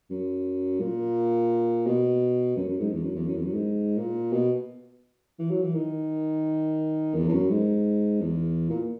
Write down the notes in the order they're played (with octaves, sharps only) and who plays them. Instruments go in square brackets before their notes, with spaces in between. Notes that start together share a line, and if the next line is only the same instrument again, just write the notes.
[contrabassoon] F#2
A#2
B2
F#2
F#2
G#2
E2
F#2
E2
F#2
E2
F#2
G#2
A#2
B2
E3
F#3
E3
D#3
E2
E2
F#2
G#2
E2
A#2